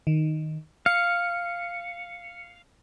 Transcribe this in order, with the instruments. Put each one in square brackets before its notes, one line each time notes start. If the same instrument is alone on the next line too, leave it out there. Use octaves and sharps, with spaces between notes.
[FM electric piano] D#3
[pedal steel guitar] F5 [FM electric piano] C#7